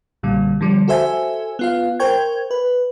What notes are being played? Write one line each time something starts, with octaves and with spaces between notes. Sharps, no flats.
B1 A#2 D3 G3
D3 F3 G3
F#4 A4 C5 E5 G#5
B3 F4 F5
A#4 C5 G5 C#6 G#6
B4